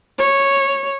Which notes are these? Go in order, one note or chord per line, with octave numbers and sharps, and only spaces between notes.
C#5